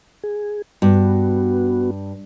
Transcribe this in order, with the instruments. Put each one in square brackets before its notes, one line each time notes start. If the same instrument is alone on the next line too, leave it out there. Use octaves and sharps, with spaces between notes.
[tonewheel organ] G#4
[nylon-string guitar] G2 [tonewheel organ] B3 F#4